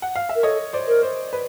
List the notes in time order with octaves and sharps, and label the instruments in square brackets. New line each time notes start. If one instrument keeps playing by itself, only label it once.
[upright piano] F#5
F5
E5
[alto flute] A#4
[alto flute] A4 [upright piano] C#5 D#5
[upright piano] C5 D5
[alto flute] A#4
[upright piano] C5
B4